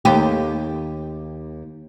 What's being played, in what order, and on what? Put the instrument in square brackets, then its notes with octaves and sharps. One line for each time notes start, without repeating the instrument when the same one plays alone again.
[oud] D#2 G4